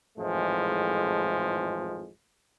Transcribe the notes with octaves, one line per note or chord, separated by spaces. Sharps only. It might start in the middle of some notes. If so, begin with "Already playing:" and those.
G#1 F2 A2 E3 F3 G#3